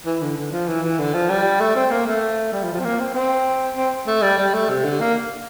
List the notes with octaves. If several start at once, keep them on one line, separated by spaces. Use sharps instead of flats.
E3
D3
D3
F3
E3
E3
D3
F3
G3
A3
C4
A#3
A3
G3
F3
F3
C4
A#3
C4
C4
C4
A3
G3
G3
A3
C3
D3
A#3